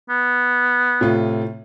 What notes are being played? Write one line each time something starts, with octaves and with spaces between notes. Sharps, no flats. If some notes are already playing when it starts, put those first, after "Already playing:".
B3
A2 C3 F4